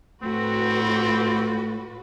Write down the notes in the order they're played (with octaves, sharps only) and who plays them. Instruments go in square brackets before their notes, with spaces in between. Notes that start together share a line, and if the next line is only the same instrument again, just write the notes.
[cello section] A2 F#4 B4 [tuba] A3 [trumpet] C4